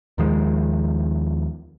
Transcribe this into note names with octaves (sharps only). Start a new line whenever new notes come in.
D#2 D#3 F3 G#3